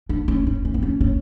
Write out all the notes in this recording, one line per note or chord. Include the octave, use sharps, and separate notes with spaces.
D4
C#4
C#4
C#4
C4
C#4
C#4